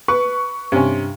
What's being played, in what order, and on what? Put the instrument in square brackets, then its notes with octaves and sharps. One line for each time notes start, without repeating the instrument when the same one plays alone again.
[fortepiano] B4 [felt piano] C#6
[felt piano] G2 [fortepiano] C3 C#4